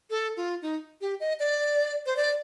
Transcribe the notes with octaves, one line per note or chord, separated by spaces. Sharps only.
A4
F4
D#4
G4
D#5
D5
C5
D5